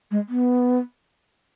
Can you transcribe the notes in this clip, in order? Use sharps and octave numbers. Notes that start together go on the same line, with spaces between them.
G#3
B3